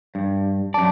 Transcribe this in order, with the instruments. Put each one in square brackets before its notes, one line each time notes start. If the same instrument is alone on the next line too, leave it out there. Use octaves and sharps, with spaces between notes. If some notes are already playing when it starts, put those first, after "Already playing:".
[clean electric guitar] G2
[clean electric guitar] F#2 D5 [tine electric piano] A5